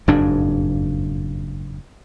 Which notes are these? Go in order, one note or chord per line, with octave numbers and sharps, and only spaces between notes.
F#1 F2 G#2 D4